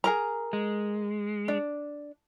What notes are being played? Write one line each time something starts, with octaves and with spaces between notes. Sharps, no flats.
G#4 A#4 A#5
G#3
D4